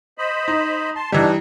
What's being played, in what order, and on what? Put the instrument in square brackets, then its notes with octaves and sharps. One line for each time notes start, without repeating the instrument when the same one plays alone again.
[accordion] C5 D#5 B5
[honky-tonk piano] D#4
[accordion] A5 C6
[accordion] G2 D4 D#4 [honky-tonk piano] E3 G3